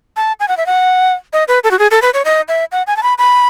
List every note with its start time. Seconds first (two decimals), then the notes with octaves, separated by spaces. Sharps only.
0.17 A5
0.40 G#5
0.48 F#5
0.57 E5
0.66 F#5
1.33 D#5
1.48 B4
1.64 A4
1.71 F#4
1.79 G#4
1.91 A4
2.02 B4
2.14 C#5
2.25 D#5
2.48 E5
2.72 F#5
2.87 G#5
2.97 A5
3.03 B5
3.18 B5